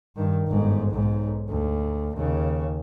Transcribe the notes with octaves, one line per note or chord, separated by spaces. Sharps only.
G2 D#3
G1 G#2
B1 G#2
D2
D#2 C#3